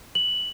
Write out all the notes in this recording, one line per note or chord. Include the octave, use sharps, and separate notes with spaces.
F#7